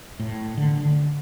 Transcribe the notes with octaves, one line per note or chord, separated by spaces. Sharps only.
A2
D3
D3